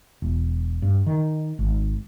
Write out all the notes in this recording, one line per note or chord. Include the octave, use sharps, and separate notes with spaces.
E1
G2
D#3
G#1